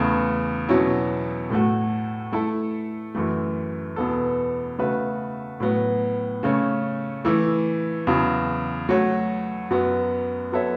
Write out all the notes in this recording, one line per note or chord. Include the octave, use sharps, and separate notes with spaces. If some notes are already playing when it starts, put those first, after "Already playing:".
Already playing: E2 C#3 A3
E2 B2 F#3 C#4 E4
A2 A3 F#4
A3 E4 A4
F#2 E3 A3
E2 B2 B3 A4
C#3 A3 F#4 B4 E5
A2 F#3 B3
C#3 A3 C#4
E3 A3 E4
E2 C#3 F#3
F#3 A3 F#4 C#5
F#2 F#3 B3
F#3 B3 A4 C#5 E5